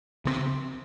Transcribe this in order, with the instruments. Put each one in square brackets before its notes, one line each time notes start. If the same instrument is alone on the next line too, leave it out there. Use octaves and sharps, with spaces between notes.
[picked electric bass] C#3 G#3 C4